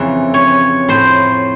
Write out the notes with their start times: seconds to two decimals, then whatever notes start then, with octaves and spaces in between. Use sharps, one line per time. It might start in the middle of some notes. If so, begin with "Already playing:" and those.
Already playing: F2 C#3 E3
0.34 C#5
0.88 A2 C5